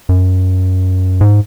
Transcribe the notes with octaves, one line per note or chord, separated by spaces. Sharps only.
F#2
G#2